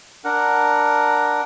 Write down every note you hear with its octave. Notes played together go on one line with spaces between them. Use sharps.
D4 A#4 F#5